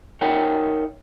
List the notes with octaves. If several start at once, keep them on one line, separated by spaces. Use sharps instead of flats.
D#4 A#4 C#5 E5 F#5 G5